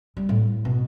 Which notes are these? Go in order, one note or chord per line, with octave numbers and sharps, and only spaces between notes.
G3
A2
B2